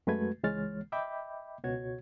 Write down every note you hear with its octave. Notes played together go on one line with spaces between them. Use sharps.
F#2 G#3 A3 F#4 B4 G#6
C#2 E3 G#3 C#5 F6 A6
D#5 E5 G5 B5 D6 G6
C#2 B2 F#4 C#5 G#6